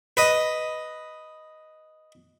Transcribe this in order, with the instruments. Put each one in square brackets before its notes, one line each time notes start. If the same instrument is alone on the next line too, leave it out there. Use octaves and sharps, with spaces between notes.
[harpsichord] B4 D#5